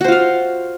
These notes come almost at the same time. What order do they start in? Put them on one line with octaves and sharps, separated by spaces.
F#4 C5 F4 F5